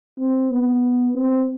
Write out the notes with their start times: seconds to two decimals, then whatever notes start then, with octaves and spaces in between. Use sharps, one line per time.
0.18 C4
0.51 B3
1.14 C4